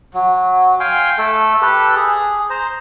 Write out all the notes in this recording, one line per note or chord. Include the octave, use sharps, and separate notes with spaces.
F#3
F5 G5 G#5 C6
A3 A4
G4 A4 B4
G#4
C5 A#5